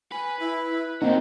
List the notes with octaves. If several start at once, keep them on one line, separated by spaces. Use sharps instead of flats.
B4 G#5
E4
A#3 C4 D#4 F#4 C5 D#5